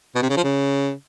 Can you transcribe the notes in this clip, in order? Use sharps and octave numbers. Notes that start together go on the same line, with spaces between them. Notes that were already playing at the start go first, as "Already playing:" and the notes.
B2
C3
C#3
F3
C#3